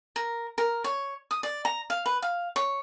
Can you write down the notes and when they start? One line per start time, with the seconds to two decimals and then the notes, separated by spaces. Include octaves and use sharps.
0.16 A#4
0.58 A#4
0.84 C#5
1.31 D#6
1.43 D5
1.65 A#5
1.90 F5
2.06 B4
2.22 F5
2.56 C#5